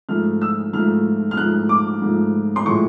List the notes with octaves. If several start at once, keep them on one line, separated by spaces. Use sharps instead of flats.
G#2 F3 A3 F6
E6
G#2 F3 A3 F6
F6
G#2 F3 A3 F#6
D6
G#2 F3 A3
C6
A2 F3 G#3 C#6